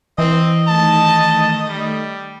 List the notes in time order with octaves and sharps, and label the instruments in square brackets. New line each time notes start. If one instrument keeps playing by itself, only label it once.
[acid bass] E3 [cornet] C4 [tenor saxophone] D#5
[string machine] D#3 A3 [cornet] A5
[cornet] G3